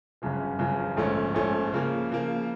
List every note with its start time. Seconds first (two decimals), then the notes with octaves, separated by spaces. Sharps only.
0.22 G1 F#2 C#3 F3
0.59 G1 F#2 C#3 F3
0.97 A#1 G#2 F3 A3 C#4
1.34 A#1 G#2 F3 A3 C#4
1.73 C#3 F3 A#3
2.10 C#3 F3 A#3